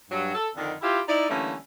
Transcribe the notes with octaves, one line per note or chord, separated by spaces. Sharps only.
G2 F#3
A4
F2 D3 D#3
E4 F4 G4
D#4 E4 D5
D3 E3 G3 A3 A#3 C#4